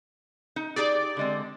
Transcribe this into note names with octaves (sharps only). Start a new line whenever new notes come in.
D#4
D#4 G4 G#4 D5
D3 G#3 C4